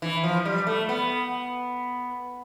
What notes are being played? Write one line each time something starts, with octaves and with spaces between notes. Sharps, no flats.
E3
F3
G3
A3
B3